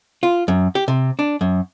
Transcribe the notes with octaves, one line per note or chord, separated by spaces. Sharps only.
F4
F#2
G4
C3
D4
F#2